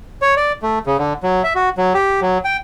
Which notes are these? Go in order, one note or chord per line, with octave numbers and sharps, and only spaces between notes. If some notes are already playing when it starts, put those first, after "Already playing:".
C#5
D5
A3
C#3
D3
F#3
E5
F#4
F#3
G4
F#3
G5